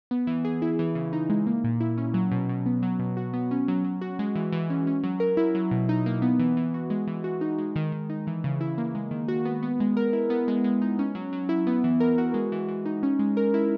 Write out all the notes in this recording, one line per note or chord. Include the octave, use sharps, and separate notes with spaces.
B3
E3
G#4
E4
E3
C#3
D#4
G#3
A#3
A#2
E4
C#4
F#3
B2
B2
B3
F#3
B2
F#4
B3
C#4
F#3
F#3
F#4
G#3
E3
E3
C#4
C#4
F#3
A#4
E4
F#3
B2
D#4
A#3
B3
E3
E3
F#4
G#3
E3
F#4
D#4
G#3
D#3
D#3
D#4
E3
C#3
E4
A#3
G#3
D#3
F#4
B3
B3
G#3
A#4
E4
B3
G#3
G#3
D#4
C#4
F#3
F#3
E4
B3
E3
A#4
F#4
G#3
E3
E3
D#4
C#4
G#3
A#4
E4